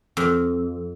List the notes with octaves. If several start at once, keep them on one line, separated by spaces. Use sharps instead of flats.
F2